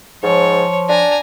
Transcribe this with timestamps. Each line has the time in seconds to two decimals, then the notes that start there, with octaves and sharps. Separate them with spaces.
0.23 G#2 F3 C#5
0.89 D4 G#5 A#5